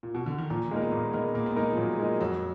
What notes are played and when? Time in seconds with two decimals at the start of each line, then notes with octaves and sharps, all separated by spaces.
0.03 A#2
0.15 B2
0.26 D3
0.38 D#3
0.50 A#2 F3
0.71 G#3 A#3 D#4 A#4
0.82 B3
0.92 A#2 A#3
1.13 G#3 B3 D#4 A#4
1.34 A#2 A#3
1.46 B3
1.56 G#3 A#3 D#4 A#4
1.72 F3
1.78 A#2 F#3
1.99 G#3 D#4 A#4
2.19 F2 F#3